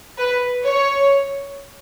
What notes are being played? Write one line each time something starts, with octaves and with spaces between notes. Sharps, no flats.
B4
C#5